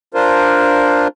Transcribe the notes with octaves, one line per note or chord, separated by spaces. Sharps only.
D4 F4 A#4 C5